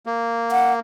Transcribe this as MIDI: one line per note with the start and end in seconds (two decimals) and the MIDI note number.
0.06 0.80 58
0.52 0.73 78